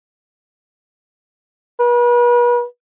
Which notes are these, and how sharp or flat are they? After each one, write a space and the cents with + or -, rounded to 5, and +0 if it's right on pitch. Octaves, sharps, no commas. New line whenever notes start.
B4 -40